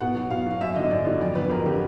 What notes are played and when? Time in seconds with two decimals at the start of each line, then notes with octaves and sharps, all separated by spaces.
0.01 B2 F#5
0.15 F#3
0.30 B2 F5
0.46 F#3 F5
0.61 F#2 E5
0.76 D3 F#3 D#5
0.91 F#2 D5
1.05 D3 F#3
1.20 F2 D5
1.35 D3 F#3 B4
1.50 F2 A#4
1.65 D3 F#3 G4